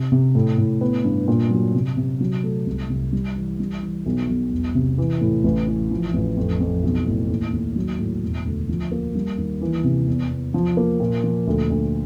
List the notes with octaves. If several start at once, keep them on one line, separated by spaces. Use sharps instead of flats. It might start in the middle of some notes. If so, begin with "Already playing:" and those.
Already playing: C3
C3
A2
A2
B3
G2
A#2
F#3
C3
C3
F#3
A3
C2
C2
G3
E3
G3
E3
B1
B1
E1
C3
E3
A2
A1
E3
F3
A1
F2
F2
B1
A2
D#2
D#2
F#3
A2
E1
D2
F3
A#3
G3
D#2
E3
C3
E2
E2
F3
A#3
A#2
F3
D2
D2